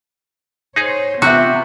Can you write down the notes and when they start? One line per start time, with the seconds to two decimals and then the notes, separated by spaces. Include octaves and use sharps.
0.76 D#4 G#4 C5 C#5
1.22 C3 B3 F4 F#4 E5 G6 C#7